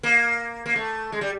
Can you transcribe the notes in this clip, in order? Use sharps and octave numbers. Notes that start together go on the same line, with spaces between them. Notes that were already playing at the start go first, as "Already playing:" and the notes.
A#3
A#3
A3
G#3
G3